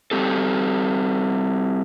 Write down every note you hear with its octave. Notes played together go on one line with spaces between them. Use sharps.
G3 C4 G4 A4